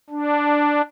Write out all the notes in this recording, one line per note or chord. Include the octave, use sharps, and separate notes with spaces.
D4